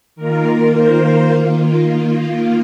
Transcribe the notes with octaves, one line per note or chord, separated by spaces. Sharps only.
D#3 A#3 F4 A#4
C5
D#3 A#3 F4